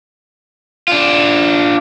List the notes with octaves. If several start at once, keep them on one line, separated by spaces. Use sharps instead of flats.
D4 F4